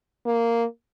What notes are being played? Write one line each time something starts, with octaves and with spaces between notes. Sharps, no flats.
A#3